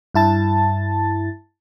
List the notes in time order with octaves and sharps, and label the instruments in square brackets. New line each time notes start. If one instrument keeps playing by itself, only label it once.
[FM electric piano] G2 E4 A5 A6